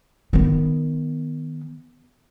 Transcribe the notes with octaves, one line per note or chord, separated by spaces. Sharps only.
D#3 B3